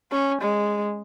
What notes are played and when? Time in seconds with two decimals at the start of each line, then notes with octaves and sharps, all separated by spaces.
0.11 C#4
0.41 G#3